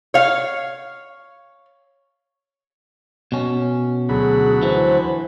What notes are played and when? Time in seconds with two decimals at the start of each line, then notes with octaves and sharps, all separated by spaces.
0.14 C#5 F5
3.32 B2 C#4
4.09 D2 F#3 G#4 B5
4.63 E3 C5